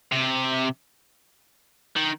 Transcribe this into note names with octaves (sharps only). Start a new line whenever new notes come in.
C3
D#3